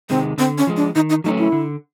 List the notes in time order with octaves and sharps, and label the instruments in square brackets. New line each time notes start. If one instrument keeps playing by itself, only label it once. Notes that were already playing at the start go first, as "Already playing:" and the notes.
[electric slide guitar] C3 D#3 G#3 [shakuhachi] C4
[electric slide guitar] D3 [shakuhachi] C4
[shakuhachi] C#4
[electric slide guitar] F3 G#3
[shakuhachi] D4
[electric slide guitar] D#3 [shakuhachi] D#4
[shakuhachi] D#4
[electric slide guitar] F#3 A3 C#4 [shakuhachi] D#4
[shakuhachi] E4
[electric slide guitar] D3